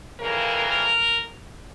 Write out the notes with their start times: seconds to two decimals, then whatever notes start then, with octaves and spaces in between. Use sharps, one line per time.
0.20 F2 C#3 E3 A#3 A#4
0.67 A#4